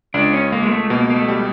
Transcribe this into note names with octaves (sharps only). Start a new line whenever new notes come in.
C#2 D4
C#4
C#2 A#3
G#3
A3
B2 A#3
A#3
A3
G3